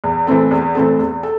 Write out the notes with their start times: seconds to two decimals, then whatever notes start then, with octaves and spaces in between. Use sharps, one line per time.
0.04 E2
0.27 E3 A3 C4 A4
0.51 E2
0.75 E3 A3 C4 A4
0.99 E2
1.23 A4